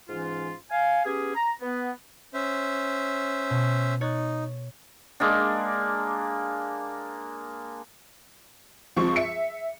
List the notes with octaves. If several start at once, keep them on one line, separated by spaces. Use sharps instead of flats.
G#2 E3 C#4 F4
F5 G#5
B3 C#4 G4 G#4
A#5
B3
C#4 C5 E5
B2
D#4 C#5 F#6 A6
G#3 A#3 D4
C#2 F3 C4 C#6
E5 C#7